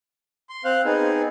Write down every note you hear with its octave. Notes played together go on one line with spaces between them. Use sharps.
C6
C4 C5 F5 F#6
B3 C4 D#4 G#4